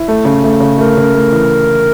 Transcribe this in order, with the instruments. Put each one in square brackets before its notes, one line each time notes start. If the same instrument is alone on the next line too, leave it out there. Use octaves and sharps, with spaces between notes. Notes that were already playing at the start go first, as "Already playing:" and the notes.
Already playing: [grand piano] E4
A3
C#3
A3
C#3
[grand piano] A3 [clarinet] A#4
[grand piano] C#3
A3
E3